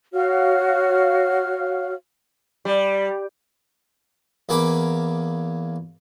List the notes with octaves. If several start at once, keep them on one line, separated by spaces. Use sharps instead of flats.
F#4 C#5 F5 F6
G3
E2 A#3 G#5 B5 D6